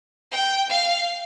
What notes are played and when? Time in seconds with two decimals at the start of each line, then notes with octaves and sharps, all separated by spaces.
0.31 G5
0.69 F5